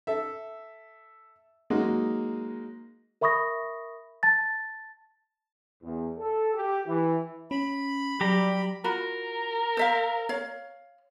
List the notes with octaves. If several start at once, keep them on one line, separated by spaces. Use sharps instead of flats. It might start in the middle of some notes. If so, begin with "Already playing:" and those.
A4 E5
F#3 G#3 A#3 D#4 F#4
A#4 E5 B5 C#6 D#6 A#6
A5 A6
E2
A4
G4
E3
C#4 B5
F#3 G3 G4 A#5
F4 F#4 A#4 B5
C5 E5 F5
C#5 F5